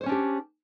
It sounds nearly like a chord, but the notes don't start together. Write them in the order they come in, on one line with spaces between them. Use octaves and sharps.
C5 C#5 C#4 D4 G4